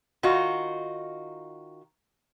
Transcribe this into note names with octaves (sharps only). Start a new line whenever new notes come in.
D#3 D#4 F4 F#4